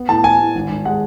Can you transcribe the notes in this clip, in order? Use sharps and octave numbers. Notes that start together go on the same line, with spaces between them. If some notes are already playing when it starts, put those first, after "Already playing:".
Already playing: B3
A2 A5
A2 G#5
A2
G#1
G#1
G#3 F#5